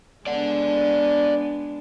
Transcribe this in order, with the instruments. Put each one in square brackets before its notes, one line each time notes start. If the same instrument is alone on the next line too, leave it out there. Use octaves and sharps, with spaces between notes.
[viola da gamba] G#3 B3 D4 [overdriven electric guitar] D5 F#5